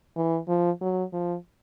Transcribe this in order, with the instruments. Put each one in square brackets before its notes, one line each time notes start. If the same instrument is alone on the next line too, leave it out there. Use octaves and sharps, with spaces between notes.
[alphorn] E3
F3
F#3
F3